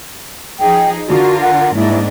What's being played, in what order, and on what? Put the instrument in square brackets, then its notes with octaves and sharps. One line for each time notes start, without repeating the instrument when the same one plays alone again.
[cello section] F3 D#4 G#4 [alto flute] G5
[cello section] D3 F4 A#4 [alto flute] F#4
[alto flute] F#5
[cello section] G#2 A#3 D4 [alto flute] E4